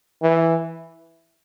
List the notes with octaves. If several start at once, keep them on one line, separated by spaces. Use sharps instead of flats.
E3